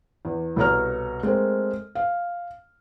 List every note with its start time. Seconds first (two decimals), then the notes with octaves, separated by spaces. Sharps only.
0.25 E2
0.56 C2 B2 A4 C#5 A#5 F6
1.23 G#3 A3 C4 A#4
1.95 F5